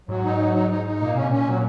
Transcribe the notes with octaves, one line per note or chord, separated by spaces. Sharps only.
G#2 F#3
D#4
F#3
D#4
D#4
D#4
A#2 A#3
C3 C#4
A#2 C#4
F#3